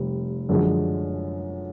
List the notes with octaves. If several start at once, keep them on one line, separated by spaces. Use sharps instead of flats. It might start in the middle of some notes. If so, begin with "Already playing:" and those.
Already playing: F1 G3
F#2 D3 F3 G#3